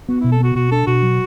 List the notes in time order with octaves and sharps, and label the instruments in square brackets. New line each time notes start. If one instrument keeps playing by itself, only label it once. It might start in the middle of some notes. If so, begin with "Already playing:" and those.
[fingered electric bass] B3 [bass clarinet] F#4
[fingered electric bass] B2 [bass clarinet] E4
[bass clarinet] A4
[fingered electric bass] B3 [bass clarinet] F#4
[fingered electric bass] B2 [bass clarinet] F#4
[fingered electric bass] D4 [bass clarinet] A4
[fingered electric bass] B2 [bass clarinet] F#4
[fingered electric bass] F#3